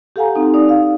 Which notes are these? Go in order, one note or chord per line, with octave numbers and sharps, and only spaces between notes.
G4 A4 F5 F#5 G#5 A#5
C4 D#4
D#4 D5 D#6
F5